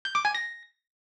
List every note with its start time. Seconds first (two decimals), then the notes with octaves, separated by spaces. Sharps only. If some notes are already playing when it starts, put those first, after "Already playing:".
0.05 G6
0.15 D6
0.25 G#5
0.35 A#6